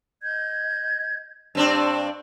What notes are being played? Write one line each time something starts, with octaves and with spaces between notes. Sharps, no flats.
D#5 G6 G#6
G2 C4 D4 D5 C6 E6